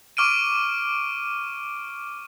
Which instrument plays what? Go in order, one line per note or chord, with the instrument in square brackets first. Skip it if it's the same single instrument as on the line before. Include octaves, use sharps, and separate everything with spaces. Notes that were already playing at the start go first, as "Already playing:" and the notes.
[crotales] C#6 D6 F6 D7 D#7